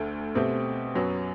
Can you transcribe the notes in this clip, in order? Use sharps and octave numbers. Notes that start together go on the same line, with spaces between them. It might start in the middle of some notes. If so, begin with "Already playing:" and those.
Already playing: D2 D3 A3
B2 A3 C4 G4
F#2 F#3 B3